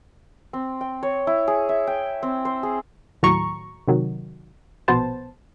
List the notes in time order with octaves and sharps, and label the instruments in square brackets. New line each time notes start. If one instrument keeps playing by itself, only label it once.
[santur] C4
G5
C#5
E4
G#4
E5
G5
C4
C5
G#4
[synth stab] D#2 A2 F#3 A#5 C#6
C3 D#3 F#3
A#1 B2 B3 C5 A5